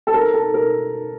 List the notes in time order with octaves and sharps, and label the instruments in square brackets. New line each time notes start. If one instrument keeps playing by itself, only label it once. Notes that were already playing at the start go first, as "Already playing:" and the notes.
[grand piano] A4
A#4
A4
A#4